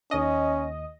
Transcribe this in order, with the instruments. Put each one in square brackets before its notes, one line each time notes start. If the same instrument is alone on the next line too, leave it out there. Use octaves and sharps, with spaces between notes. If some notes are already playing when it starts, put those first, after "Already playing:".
[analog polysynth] D#2 D#5 [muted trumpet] C#4